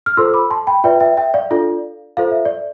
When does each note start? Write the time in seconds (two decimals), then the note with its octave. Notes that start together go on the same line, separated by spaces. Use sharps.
0.06 F6
0.17 F4 A4 C5 C6 E6
0.33 B5 D6
0.51 A5 C6
0.67 G5 B5
0.84 F4 B4 D5 E5 G5
1.00 E5 G5
1.17 E5 G5
1.34 D5 F5
1.50 D4 F4 A4 D5
2.17 F4 A4 C5 F5
2.31 E5
2.45 D5